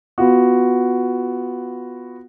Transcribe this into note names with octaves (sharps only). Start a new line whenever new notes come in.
B3 F4 F#4